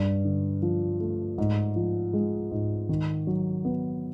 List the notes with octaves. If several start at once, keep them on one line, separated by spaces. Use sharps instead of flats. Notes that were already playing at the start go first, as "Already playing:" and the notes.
Already playing: G2
D3
F3
A3
G#2
F3
G#3
G#2
D#3
F#3
B3